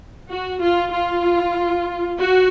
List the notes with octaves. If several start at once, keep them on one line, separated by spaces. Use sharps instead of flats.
F#4
F4
F4
F#4